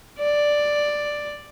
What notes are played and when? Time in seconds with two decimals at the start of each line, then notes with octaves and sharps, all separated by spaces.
0.18 D5